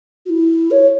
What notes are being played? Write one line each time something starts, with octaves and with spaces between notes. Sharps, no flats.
F#4
E4
C#5